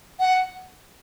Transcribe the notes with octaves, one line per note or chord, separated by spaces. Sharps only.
F#5